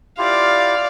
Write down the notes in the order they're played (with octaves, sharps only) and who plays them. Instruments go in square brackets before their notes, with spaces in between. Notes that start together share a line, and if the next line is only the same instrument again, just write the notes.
[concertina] E4 F4 G4 [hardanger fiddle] D5 F5